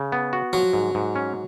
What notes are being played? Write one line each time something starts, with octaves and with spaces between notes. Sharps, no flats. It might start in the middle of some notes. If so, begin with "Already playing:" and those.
Already playing: C#3
B3
F#4
F3 F#3
G#2
G#2
C#4